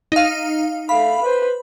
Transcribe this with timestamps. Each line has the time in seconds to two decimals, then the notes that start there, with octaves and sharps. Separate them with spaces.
0.12 D#4 F5
0.89 A3 F5 B5
1.23 B4 C5